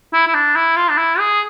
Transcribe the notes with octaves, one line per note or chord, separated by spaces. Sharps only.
E4
E4
D4
E4
F4
D4
E4
G#4